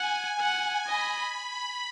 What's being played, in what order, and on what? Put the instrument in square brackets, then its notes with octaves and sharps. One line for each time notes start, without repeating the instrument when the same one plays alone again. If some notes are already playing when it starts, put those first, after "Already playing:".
Already playing: [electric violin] F#5 [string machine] G#5
[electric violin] F#5
[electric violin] D#5 [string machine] B5